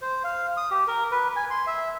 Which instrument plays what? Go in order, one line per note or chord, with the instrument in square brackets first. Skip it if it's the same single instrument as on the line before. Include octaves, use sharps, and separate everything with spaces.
[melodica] C5
F5
D#6
G4
A#4
B4
G#5
C6
E5